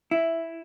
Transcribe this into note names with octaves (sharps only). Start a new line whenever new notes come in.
E4